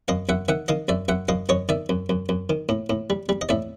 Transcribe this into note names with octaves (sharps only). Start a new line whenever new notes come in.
F#2 D#5 F5
F#2 E5 F#5
D#3 E5 F#5
D#3 D#5 F5
F#2 D5 E5
F#2 E5 F#5
F#2 D#5 F5
F#2 C#5 D#5
D#3 D5 E5
F#2
F#2
F#2
D#3
A2
A2
G3
G3
D#5
A2 D5 E5